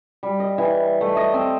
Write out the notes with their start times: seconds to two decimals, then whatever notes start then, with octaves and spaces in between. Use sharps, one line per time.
0.23 G3
0.40 D#5
0.58 E3
1.01 A3
1.17 D#5
1.34 C4